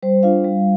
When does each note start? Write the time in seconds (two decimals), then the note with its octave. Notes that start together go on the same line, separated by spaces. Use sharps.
0.03 G3 C5
0.23 D4 F4 F5
0.44 G3